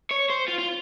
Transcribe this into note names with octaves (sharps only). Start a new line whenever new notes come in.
C#5
C5
F4
F4